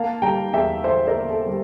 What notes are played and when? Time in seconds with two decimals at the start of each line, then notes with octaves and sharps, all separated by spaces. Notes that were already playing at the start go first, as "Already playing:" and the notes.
Already playing: A#3 F5 A5
0.22 G3 G5 A#5
0.53 E2 E5 G5
0.84 E3 C5 E5
1.07 A#4 D5
1.15 A#3
1.30 A4
1.46 G3